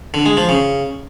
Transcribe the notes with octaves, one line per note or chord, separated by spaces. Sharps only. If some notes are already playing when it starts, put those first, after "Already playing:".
D3
G#3
F3
C#3